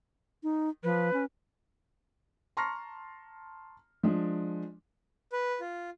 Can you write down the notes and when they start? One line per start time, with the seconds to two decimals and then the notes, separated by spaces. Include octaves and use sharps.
0.43 D#4
0.83 F3 B4
1.13 C#4
2.57 A5 A#5 C6 C#6 F6 A#6
4.03 F3 G#3 D4
5.32 B4
5.60 F4